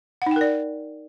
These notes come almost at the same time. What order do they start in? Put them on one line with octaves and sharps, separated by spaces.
F#5 D#4 G5 A#4 D5